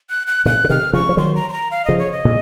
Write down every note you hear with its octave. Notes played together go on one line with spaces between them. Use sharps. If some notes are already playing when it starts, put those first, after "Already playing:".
F#6
F#6
A#2 C#3 F#6
C#3
C3 D#3 F6
C#3 F3 C#6
F3
D#3 F#3 C6
A#5
C6
A#5
F5
C#3 F3 D#5
C#5
D#5
A#2 C#3